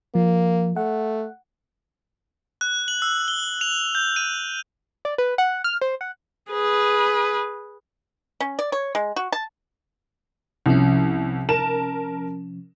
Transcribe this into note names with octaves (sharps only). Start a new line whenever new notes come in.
F3 A#3
A3 F#5
F#6
F#7
E6
G7
F7
G6
D#7
D5
B4
F#5
F6
C5
F#5
G#4 B4
C#4
D5
C#5
G#3
F#4
A5
C2 C3 F3 C#4
A#4 A5 E7